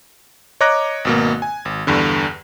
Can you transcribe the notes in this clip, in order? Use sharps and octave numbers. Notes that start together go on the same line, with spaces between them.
C#5 D#5 A#5 D6 F#6 A#6
G#1 B2 A#3
G#5
G#1
E2 G2 D3